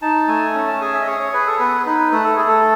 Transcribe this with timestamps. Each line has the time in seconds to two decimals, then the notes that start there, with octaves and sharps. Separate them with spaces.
0.02 D#4 A5
0.28 A3 G#5
0.55 C#4
0.67 A5
0.81 G#4 G#5
0.94 E5
1.02 D#5
1.07 G#4 C#5
1.20 C#5
1.33 G#4 B4
1.47 A4
1.59 B3 B4
1.86 D#4 B4
2.12 A3 B4
2.24 A4
2.36 A3 G#4
2.48 A4